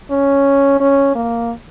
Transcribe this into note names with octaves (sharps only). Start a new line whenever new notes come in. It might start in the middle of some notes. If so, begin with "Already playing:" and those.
C#4
C#4
A#3